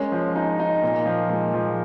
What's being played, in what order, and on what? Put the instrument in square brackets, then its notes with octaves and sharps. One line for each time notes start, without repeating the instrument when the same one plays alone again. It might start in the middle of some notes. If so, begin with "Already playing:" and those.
Already playing: [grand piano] G#3 A#3 [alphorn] C#4
[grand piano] F3
D#4
D#4
[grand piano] A#2 [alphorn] A#3
[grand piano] F3
[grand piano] A#2 [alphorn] G#3
[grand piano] F3